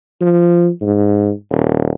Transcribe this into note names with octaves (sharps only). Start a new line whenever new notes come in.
F3
G#2
D#1